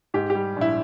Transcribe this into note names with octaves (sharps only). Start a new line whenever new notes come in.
G#2 G4
G4
G3
A#1 E4